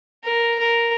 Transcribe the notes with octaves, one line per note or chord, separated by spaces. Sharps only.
A#4
A#4